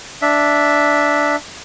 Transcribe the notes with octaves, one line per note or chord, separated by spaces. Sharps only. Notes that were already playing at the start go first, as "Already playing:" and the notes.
D4 E5